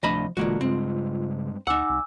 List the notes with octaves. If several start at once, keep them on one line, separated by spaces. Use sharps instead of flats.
D1 C2 F3 A3 D4 D#5 B5
E1 A#2 D3 E3 G#3 A#3 F4 F#4
G2 C#3 G#3 C4
D2 D#4 F#5 G#5 D6 E6
C2